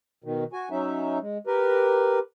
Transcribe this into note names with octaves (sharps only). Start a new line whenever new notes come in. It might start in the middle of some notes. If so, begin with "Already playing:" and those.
B2 D#3
F#4 G#5
F#3 C#4 D#4 E5
G#3
G4 A#4 B4